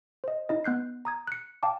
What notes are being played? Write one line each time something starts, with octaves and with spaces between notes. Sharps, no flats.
C5 D#5
D#4 E4 D#5
B3 F#6 G6 C7
A#5 D#6 G#6
F#6 C#7
F5 G5 A5 D6